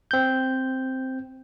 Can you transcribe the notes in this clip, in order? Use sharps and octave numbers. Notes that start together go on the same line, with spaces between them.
C4 G6